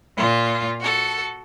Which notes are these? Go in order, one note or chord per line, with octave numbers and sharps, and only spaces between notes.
A#2 F4
F#4 A4